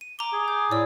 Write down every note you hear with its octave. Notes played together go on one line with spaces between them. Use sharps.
D#7
A#5 D6 G7
G#4
G6
A2 D5 E6